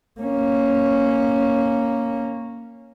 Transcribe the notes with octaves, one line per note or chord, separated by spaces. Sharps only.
A#3 C#4